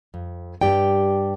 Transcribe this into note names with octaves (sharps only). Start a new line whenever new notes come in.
F2
G2 G4 D5 G5